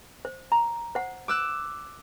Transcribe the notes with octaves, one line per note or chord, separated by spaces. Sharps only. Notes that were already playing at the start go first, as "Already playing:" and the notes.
C5
A#5
C5 F#5
D6 E6 F#6